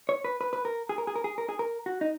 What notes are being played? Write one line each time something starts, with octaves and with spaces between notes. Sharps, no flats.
C#5
B4
B4
B4
A#4
G#4
A#4
G#4
A#4
G#4
A#4
G#4
A#4
F#4
D#4